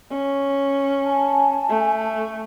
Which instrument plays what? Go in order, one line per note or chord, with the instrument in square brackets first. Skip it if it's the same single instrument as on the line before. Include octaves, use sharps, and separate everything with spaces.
[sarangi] C#4
[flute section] G#5 A5
[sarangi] A3